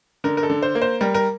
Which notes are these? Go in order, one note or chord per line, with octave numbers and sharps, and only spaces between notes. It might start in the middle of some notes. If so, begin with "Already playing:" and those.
D3 A#4
A#4
A4
D3
C5
A#3
C5
G3 A#4
A#4